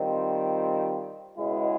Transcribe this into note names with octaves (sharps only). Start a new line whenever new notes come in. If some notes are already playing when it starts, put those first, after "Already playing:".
Already playing: D#3 G3 C4 F4
C#2 B2 G#3 B3 E4